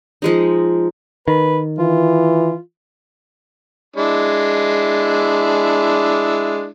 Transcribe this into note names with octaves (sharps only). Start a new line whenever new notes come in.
F3 G#3 D#4
D#3 B4
E3 F4
G#3 D4 E4